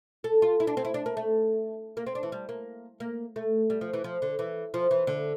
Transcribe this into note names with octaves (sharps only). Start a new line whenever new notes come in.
A4
F4
E4
D4
C4
E4
D4
A#3
A3
A#3
C4
D4
E3
G3
A#3
A#3
A3
G3
F3
E3
F3
D3
E3
F3
E3
D3